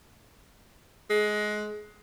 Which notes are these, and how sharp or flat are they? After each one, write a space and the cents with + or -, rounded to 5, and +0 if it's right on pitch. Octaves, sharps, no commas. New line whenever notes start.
G#3 +20